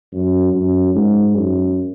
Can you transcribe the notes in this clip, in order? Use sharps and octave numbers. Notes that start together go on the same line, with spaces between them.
F#2
F#2
G#2
F#2